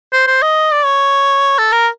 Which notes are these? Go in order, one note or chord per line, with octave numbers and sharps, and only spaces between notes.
C5
C5
D#5
D5
C#5
A4
A#4